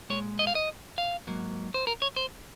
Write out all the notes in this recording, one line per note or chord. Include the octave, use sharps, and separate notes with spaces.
A#2 G#3 C#5
D#5
F5
D#5
F5
G#2 F#3 A#3
C5
A#4
C#5
C5